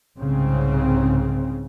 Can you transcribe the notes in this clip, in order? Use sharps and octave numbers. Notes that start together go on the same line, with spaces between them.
C2 G#2 C#3 C4